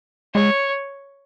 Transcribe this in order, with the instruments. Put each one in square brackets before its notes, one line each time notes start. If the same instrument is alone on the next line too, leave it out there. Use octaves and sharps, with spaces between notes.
[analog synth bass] G#3 [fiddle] C#5